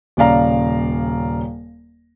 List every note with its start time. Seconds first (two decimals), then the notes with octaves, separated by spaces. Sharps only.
0.17 D#1 C#3 D5 F5 A#5